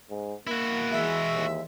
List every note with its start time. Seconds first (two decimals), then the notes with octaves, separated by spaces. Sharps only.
0.10 G#2
0.47 A#3 E4 F#4
0.92 E3 G#3 E5
1.34 D#2